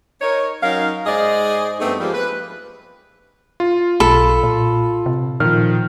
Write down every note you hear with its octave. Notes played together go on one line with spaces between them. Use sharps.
D#4 A#4 C#5
F#3 C#4 D#4 A#4 F5
G#2 G#4 C5 D5 D#5
G2 A3 B3 C4 D#4 G#4
F3 G3 G#3 A#3 G4
B4
F4
B1 A4 B5
A#2
C3
A#2 D#3 F3 F6